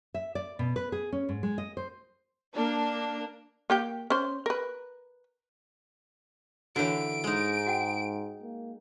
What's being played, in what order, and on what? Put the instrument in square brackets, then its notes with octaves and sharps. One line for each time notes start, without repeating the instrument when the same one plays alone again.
[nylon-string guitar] E5
D5
B2
B4
G#4
C#4
G#2
G#3
D#5
C5
[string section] A#3 D4
[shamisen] A#3 G4 G5
C#4 C5
A#4 B4
[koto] D3 E3 [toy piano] F#4 A#4 C#5 [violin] D7
[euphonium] G#2 [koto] G#3 D#4
[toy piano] F#4 F#5 G5
[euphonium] A#3